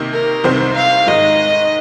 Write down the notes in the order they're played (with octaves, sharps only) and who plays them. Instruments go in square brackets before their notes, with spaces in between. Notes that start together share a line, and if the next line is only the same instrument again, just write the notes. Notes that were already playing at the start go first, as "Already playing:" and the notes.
Already playing: [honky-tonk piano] C3 D#3 A#3 D#4
[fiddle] A#4
[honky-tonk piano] C2 C3 D#3 C4 [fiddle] C5
[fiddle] F5
[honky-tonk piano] G#2 D#3 G#3 D#4 [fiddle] D#5